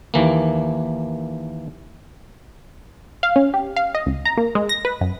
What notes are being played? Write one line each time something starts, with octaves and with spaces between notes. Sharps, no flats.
D#2 E3 A#3
F5
C#4
G4
F5
D#5
C#2
A#5
A#3
G#3
A#6
B4
F#2